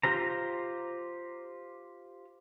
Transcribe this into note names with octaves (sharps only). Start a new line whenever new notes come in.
F4 G4 C5 A#5